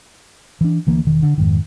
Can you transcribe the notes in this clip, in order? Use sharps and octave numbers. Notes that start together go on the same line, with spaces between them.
E3 D4
D2 E3 A#3
E1 D#3
D3
F2 G#2 D#3